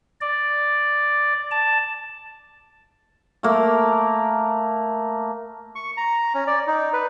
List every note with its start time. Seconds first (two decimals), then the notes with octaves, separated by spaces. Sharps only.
0.21 D5
1.51 A5
3.43 A3 A#3
5.75 C#6
5.97 A#5
6.34 C#4
6.47 D5
6.67 D#4
6.93 B4